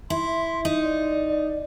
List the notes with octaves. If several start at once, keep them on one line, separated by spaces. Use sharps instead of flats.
E4 C6
D#4
D5